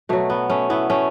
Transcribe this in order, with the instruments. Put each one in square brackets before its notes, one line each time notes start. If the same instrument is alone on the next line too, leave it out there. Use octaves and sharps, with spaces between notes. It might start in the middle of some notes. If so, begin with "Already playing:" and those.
[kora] B2 F#3 A3
B3
A3 C#4
B3 E4
A3 C#4